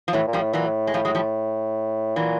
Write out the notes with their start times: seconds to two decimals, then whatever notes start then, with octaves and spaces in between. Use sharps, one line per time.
0.08 F3
0.13 A2 E3 F#3
0.27 A#2
0.33 F3 G3
0.40 A2
0.53 A#2 E3 F#3
0.66 A2
0.87 G#3
0.94 A2 F3 G3
1.05 F#3 G#3
1.15 F3 G3
2.16 A#2 E3 F#3